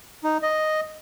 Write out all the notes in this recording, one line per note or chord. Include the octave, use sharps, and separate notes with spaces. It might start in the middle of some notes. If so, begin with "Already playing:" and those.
D#4
D#5